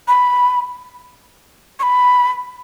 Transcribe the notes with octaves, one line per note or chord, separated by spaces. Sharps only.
B5
C#6
B5